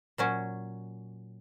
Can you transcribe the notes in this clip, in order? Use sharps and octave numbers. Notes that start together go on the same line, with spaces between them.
A#2 F#3 C#4